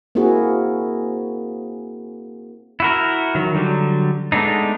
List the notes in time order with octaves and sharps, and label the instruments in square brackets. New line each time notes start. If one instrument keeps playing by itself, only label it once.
[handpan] A#3 C4 E4 F#4 G#4
[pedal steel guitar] E4 F#4 A#4
D#3 F#3
D3 F#3 G3
G#3 A3 B3 D4 D#4